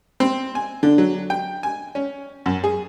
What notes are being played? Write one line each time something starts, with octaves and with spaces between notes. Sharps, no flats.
C4
G#5
D3
F#3
G5
G#5
C#4
F#2
G#4